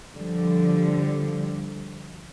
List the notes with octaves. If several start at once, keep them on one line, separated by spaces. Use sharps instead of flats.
D3 F3 G3